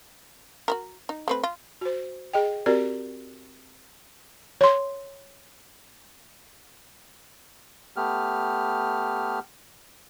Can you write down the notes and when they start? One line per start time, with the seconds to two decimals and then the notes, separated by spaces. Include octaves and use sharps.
0.68 F#4 G4 A#4
1.09 D#4
1.28 A3 C4 B4
1.44 F4
1.81 F#4 C5
2.33 G#4 D#5 G5
2.66 C4 F#4 G4 A#4 D5
4.61 C#5 C6
7.96 A3 B3 G4 F6